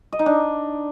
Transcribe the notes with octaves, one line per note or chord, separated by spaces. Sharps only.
D#5
D#4
D4